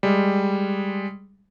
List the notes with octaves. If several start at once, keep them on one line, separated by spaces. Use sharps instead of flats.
G3 G#3